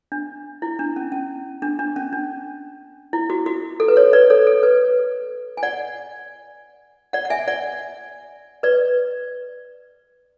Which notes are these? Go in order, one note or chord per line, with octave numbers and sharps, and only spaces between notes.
D4
E4
D4
C#4
C#4
D4
D4
C#4
D4
E4
F#4
F#4
A4
B4
A4 C#5
B4 D5
A4 C#5
A4
B4
G#5
D5 F#5
D5 F#5
F#5
E5 G#5
D5 F#5
B4 D5